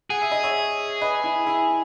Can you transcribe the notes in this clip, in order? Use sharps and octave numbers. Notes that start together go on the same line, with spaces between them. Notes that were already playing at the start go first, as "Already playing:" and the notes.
G#4 F#5
E5
D#5
C#5 E5
B4 D#5
E4
E4